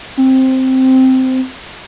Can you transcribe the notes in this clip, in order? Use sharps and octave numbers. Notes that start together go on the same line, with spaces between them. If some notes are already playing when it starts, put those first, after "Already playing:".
C4